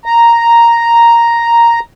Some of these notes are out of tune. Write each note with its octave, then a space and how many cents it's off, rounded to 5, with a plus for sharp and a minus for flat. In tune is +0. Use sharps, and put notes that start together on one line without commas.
A#5 +0